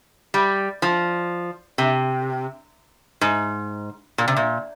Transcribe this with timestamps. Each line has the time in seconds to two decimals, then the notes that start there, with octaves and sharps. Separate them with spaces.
0.34 G3
0.82 F3
1.78 C3
3.21 G#2
4.18 A#2
4.28 C3
4.36 A#2